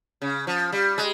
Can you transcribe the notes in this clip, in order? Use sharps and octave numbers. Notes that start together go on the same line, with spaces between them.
C#3
F3
G3
G#3